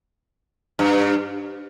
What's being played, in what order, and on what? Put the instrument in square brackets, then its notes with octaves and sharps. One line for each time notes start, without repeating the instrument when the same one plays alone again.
[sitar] G2